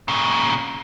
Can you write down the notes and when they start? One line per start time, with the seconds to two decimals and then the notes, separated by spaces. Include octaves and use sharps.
0.08 A#2 C#3